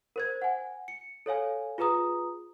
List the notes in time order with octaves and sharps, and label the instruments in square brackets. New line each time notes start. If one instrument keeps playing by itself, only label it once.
[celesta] A#4 C5 G#6
F#5 G#5
C#7
A4 C#5 F5 G#5
F4 G#4 B4 A#5 D#6